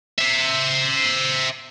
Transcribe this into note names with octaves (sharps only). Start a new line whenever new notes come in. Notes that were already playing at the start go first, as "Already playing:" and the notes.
C5 E5